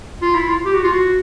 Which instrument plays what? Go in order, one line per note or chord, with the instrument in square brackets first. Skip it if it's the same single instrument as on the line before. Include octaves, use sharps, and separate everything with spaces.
[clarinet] F4
E4
F4
G4
F#4
F4
F#4